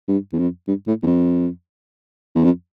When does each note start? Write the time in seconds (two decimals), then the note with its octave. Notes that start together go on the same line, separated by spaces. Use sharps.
0.08 G2
0.33 E2
0.39 F2
0.67 G2
0.87 A2
1.03 E2
1.06 F2
2.35 E2
2.44 F2